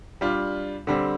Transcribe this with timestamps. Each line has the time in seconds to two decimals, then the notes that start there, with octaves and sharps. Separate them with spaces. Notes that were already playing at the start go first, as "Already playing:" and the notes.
0.21 G3 D4 F4
0.87 D3 G3 C4